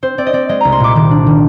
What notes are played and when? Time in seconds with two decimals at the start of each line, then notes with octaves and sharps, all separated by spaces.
0.02 C4 C5
0.18 C4 D5
0.27 D#5
0.33 C4 D5
0.49 G#3 D#5
0.61 C2 A#5
0.72 C6
0.80 A#2 D6
0.95 D#3 D6
1.11 D4
1.27 D#3